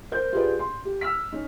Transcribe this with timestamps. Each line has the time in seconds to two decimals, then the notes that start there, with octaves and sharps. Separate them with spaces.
0.12 A#4 C5 G6
0.33 F4 G4 G#4 B4 D5
0.59 C6
0.85 G4
1.01 E6 F6 B6
1.32 C#4 D#4